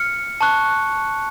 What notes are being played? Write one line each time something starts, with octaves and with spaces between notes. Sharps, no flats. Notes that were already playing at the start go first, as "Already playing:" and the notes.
Already playing: F6 C#7
A5 C#6 F#6